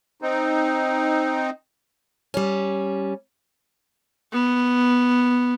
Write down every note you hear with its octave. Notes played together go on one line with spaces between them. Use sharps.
C4 D#4
G3 C#4
B3